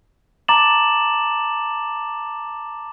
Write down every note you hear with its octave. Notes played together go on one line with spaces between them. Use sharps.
A5 A#5 D6 A6 E7 F#7